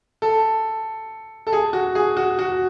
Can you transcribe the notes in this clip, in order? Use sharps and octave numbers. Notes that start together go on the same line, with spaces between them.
A4
A4
G#4
F#4
G#4
F#4
F#4